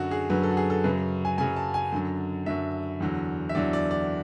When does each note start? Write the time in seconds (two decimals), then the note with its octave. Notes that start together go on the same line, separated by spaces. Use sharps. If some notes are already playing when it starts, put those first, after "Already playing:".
Already playing: F#2 D3 F#3 F#4
0.11 G#4
0.30 F#2 D3 F#3 B4
0.43 A4
0.51 F#4
0.57 G#4
0.70 A4
0.84 F#2 C#3 F#3 B4
1.25 G#5
1.38 F#2 C#3 F#3 G#5
1.56 A5
1.74 G#5
1.92 F#2 D3 F#3
2.46 F#2 D3 F#3 E5
3.00 E2 D3 F#3
3.49 E5
3.55 E2 D3 F#3 D5
3.73 D5
3.91 D5